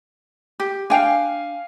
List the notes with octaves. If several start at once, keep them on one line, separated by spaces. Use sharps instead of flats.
G4
D4 F5 G5 G#5